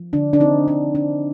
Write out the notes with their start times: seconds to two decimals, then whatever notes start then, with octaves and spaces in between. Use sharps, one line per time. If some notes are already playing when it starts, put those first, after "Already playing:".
Already playing: F3
0.13 D3 D4
0.33 D4
0.40 C4 D#4
0.68 D4
0.95 D4